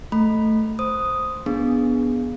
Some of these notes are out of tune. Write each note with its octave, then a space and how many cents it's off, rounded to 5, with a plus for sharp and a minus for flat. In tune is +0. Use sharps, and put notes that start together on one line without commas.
A3 +0 B5 +0
C5 +0 D#6 +0
B3 -5 D4 -20 G#4 +0